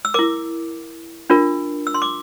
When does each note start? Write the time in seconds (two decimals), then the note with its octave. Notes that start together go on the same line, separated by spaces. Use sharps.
0.05 E6
0.14 E4 A#4 D6
1.30 D4 F4 A#4
1.87 E6
1.94 C6
2.02 D6